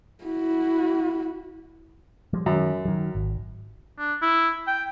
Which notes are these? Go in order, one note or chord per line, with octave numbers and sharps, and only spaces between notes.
E4 F#4
F3 G3 G#3
F#2 D#3 G#3
D#3 F#3
G#1
D4
E4
G5